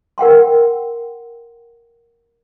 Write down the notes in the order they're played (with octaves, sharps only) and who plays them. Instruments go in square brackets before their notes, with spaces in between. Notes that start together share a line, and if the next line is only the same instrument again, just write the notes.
[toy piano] A#4 F#5 G5 C6